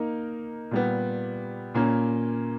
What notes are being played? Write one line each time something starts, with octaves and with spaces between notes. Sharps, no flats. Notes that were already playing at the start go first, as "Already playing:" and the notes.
Already playing: A#3 D#4 A#4
A#2 G3 B3
A#2 A#3 C#4